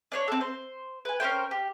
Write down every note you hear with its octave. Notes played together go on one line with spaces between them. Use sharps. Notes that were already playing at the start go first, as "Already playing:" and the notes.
D4 C5 C#5
C4 A4
C5
B4 G#5
C#4 A#4 C5 G5
G4